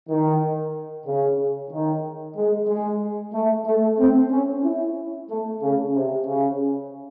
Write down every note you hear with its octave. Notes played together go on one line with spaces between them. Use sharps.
D#3
C#3
D#3
G#3
G#3
A3
A3
C4
C#4
E4
A3
C#3
C3
C#3